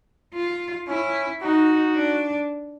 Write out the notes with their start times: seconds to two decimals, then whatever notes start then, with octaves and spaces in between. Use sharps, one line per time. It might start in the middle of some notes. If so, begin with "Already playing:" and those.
0.34 F4
0.88 C#4 E4
1.42 D#4 F#4
1.96 D4